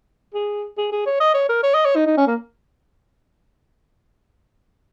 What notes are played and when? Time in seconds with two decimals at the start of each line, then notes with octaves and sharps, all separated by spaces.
0.34 G#4
0.77 G#4
0.92 G#4
1.06 C#5
1.20 D#5
1.34 C#5
1.49 A#4
1.63 C#5
1.74 D#5
1.85 C#5
1.96 D#4
2.06 D#4
2.17 C#4
2.27 A#3